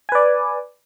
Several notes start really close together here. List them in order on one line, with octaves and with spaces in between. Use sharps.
G#5 B4 D5